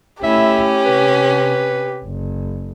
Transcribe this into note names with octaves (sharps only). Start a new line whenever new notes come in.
A3 C#4 E4 G4 E5
C3 B4
F#1